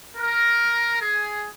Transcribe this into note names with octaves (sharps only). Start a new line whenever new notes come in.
A#4
G#4